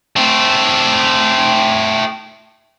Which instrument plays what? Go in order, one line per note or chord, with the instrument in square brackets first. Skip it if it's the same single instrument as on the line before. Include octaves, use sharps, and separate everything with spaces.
[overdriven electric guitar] A3 C4